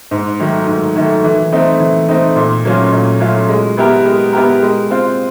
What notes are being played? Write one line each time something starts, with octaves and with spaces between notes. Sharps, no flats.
G#2
D#3 F#3 A3
G#2
D#3 F#3 A3
E3
A3 C4 D#4
E3
A3 C4 D#4
A#2
F#3 A3 C#4 F4
A#2
F#3 A3 C#4 F4
G#3
B3 E4 G4 A#4
G#3
B3 E4 G4 A#4
G#3
C4 F4